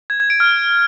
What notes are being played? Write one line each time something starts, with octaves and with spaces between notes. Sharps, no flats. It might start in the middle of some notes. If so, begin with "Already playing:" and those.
G#6
G#6
D7
F6